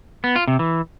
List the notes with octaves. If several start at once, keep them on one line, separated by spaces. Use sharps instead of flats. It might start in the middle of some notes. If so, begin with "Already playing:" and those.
B3
F4
C3
E3